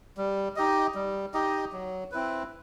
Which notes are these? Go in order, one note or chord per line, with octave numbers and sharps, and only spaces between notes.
G3
D#4 G4 D#5
G3
D#4 G4 D#5
F#3
C4 E4 B4